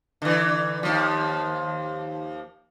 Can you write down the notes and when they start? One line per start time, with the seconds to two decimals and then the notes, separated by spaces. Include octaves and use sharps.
0.22 D3 E3
0.83 D#2 F3